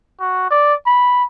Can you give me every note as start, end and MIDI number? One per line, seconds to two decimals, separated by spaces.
0.20 0.47 66
0.50 0.74 74
0.86 1.23 83